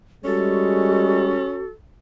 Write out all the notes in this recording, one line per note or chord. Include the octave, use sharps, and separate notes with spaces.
G3 G#3 C#4 F#4 A4